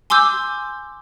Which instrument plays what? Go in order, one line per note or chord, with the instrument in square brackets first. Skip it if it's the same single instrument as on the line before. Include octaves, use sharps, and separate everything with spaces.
[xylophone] G#5 C6 D6 E6 G6